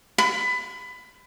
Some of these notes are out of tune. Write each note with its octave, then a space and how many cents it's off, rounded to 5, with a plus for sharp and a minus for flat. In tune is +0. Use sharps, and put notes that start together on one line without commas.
B5 +20